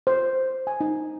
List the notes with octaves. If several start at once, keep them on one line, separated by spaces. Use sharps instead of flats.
C5
G#5
D#4